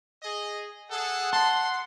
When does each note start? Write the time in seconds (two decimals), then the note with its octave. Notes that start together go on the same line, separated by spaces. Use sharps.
0.23 G#4 D#5
0.91 G#4 A4 F#5
1.33 A5 C6